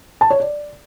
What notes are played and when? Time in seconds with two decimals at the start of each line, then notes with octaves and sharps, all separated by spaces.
0.21 A5
0.30 C#5
0.40 D5